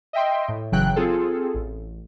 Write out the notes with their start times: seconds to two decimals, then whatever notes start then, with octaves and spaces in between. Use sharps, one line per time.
0.13 D#5 E5 G5 C6
0.48 A2
0.72 G1 C#3 E3 F#3 G5 F#6
0.96 C4 F4 G#4 A4
1.54 A1